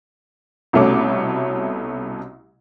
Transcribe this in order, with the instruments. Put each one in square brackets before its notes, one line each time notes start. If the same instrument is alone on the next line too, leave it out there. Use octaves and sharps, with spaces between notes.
[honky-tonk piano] C2 B2 A3 C#4 D6